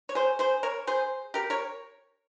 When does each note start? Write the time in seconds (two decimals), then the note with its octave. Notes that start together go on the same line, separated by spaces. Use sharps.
0.09 C#5
0.15 G#4 C5
0.39 G#4 C5
0.63 A#4 C#5
0.87 G#4 C5
1.34 G4 A#4
1.50 A#4 C#5